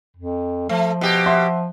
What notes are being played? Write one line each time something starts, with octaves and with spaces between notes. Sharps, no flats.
F2
F3 A3
B2 G4
E5 F#5 C6